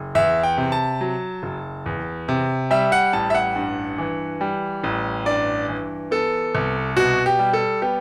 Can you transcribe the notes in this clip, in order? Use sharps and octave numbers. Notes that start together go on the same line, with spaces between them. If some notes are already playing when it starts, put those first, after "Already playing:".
Already playing: F#1
E2 E5
G5
C3
A5
F#3
F#1
E2
C3
G3 E5
F#5
A1 A5
E5
F#5
G2
E3
G3
A1
G2 D5
E3
B3 A4
C2
B2 F#4
G4
G3
A4
B3 G4